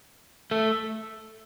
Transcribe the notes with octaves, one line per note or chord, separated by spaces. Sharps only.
A3